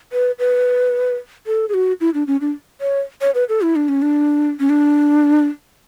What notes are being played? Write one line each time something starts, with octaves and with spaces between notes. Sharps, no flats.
B4
B4
A4
G#4
F#4
E4
D4
C#4
D4
C#5
C#5
B4
A4
E4
D4
C#4
D4
C#4
D4